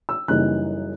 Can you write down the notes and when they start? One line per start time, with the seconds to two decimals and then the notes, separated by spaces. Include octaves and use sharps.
0.09 E6
0.28 F#1 F#2 E3 G3 D#4 F#6